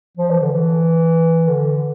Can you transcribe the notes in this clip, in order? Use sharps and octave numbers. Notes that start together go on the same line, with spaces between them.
F3
E3
D3
E3
D3